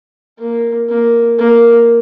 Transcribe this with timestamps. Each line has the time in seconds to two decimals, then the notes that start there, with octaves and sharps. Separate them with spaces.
0.39 A#3
0.89 A#3
1.39 A#3